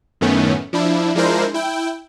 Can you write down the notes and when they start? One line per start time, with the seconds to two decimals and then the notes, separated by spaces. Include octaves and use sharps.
0.21 F#2 A2 D#3 A3 B3 C#4
0.73 F3 D4 E4
1.15 F3 G#3 D4 E4 A#4 C5
1.54 E4 G5